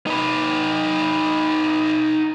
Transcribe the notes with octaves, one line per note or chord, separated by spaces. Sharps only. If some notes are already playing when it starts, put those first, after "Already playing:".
D#4 B4